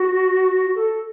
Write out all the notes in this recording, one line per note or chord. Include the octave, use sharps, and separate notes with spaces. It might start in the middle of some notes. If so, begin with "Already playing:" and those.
Already playing: F#4
A4